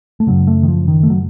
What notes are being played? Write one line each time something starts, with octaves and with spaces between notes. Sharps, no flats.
A3
F#2 C#3 F#3
A3
D#3
F3
D#3
A3
F#3